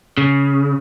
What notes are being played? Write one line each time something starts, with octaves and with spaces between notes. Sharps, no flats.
C#3